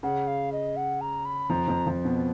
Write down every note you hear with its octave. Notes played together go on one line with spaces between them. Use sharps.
C#3 F#5
F5
D#5
F#5
A#5
B5
F2 F3 A#5
F2 F3
F2 F3
B2 B3